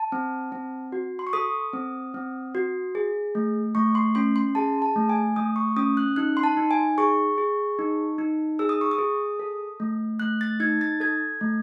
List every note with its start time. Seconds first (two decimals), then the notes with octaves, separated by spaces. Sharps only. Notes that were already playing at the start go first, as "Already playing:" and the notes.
Already playing: A5
0.12 C4
0.52 C4
0.92 F#4
1.19 C6
1.27 C#6
1.33 A4 D#6
1.73 C4
2.14 C4
2.55 F#4
2.95 G#4
3.35 A3
3.75 A3 C#6
3.95 C6
4.15 C#4 C6
4.36 C6
4.55 G#4 A5
4.82 A5
4.96 A3
5.09 G#5
5.36 A3 D#6
5.56 C#6
5.77 C#4 D#6
5.97 F#6
6.16 D#4 F#6
6.37 C6
6.43 A5
6.57 D#4
6.71 G#5
6.98 G#4 C#6
7.38 G#4
7.79 D#4
8.18 D#4
8.59 G#4 E6
8.69 D#6
8.81 C#6
8.91 D#6
8.99 G#4
9.39 A4
9.80 A3
10.20 A3 F#6
10.41 A6
10.60 D#4 G#6
10.81 A6
11.00 A4 G#6
11.41 A3